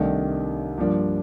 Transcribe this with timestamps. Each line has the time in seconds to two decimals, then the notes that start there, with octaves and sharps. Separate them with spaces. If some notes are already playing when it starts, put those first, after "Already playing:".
Already playing: C2 C3 D#3 A3 D4
0.78 G2 F3 A#3 D4